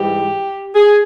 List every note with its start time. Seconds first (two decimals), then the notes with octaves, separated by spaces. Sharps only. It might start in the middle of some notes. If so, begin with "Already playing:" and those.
Already playing: G#2 E3 G3 G4
0.74 G#4